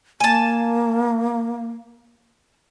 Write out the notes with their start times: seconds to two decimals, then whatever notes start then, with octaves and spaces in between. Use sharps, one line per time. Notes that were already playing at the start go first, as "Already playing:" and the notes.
0.20 A#3 G#5 A5